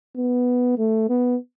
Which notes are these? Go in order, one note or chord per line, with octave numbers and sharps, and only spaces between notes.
B3
A3
B3